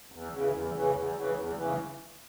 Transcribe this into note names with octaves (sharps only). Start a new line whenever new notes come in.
E2
C#3 E3
E2
C#3 E3
E2
C#3 E3
E2
C#3 E3